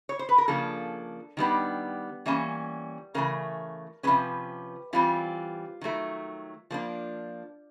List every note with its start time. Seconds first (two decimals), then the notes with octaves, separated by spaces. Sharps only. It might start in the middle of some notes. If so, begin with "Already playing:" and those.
0.09 C#5
0.19 C5
0.29 B4
0.38 A#4
0.48 C#3 F3 A#3 D4 A4
1.37 D#3 G3 B3 D4
2.26 E3 G3 A#3 C#4
3.14 C#3 E3 A3 A#4
4.03 C3 F3 G#3 C#4 B4
4.93 E3 G3 C4 F4
5.81 D#3 F#3 A3
6.70 F3 A#3 D4